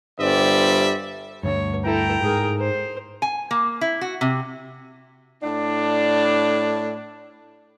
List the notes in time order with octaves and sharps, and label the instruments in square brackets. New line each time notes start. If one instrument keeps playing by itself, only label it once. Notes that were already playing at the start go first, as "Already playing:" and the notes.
[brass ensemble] G1 G2 G3 C5 D5 E5
[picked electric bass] D2 G2 [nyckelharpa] C#5
[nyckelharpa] E4 A4 [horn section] G5 A#5
[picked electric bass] G#2 [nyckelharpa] G#4 A#4
[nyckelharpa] C5
[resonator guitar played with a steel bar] G#5
A#3
E4
F#4
C3
[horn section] A2 D4